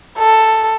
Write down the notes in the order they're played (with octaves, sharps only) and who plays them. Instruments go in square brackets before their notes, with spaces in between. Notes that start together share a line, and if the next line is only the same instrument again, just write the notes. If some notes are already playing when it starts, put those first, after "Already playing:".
[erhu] A4